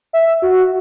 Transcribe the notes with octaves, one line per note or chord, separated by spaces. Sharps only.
E5
F#4